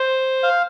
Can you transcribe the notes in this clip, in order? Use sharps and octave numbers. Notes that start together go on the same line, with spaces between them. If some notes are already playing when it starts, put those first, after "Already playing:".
Already playing: C5
F5